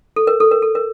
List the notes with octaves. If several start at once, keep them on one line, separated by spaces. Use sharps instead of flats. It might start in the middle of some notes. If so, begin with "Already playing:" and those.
A4
A#4
A4
A#4
A4
A#4